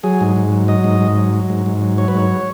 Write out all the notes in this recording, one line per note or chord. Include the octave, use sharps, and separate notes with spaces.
F#3 G#4
G#2
G#2
F#3
F#3 D#5
G#2
G#2
F#3
F#3
G#2
G#2
F#3
F#3 C#5
B4
G#2 C#5